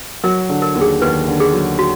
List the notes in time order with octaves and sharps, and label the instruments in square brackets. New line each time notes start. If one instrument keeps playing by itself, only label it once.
[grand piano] F#3 [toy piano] A#4
[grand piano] D3
[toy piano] A#4
[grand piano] D#2
[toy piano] G#4
[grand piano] D#2 [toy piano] B4
[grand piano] D3
[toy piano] G#4
[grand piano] F#3
[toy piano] F#4